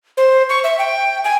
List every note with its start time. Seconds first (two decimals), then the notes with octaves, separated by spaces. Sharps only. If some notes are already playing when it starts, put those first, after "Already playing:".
0.17 C5
0.49 C#6
0.64 E5
0.78 G5
1.24 G#5